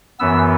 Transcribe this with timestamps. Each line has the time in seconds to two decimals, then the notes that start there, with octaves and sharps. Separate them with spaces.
0.19 F#2 E3 B3 E6